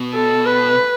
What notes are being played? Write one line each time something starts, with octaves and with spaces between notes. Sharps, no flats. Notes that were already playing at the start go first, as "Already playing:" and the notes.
Already playing: B2
A4
B4